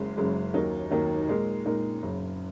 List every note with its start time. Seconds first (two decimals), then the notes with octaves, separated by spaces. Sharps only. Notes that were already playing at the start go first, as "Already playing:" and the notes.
Already playing: F#1 F#2 C#3 G#3
0.17 F#1 F#2 C#3 G#3
0.54 D#2 D#3 F#3 D#4 A#4
0.91 D#2 D#3 F#3 D#4 A#4
1.28 A#2 G#3 D#4 A#4
1.66 A#2 G#3 D#4 A#4
2.02 F#1 F#2 C#3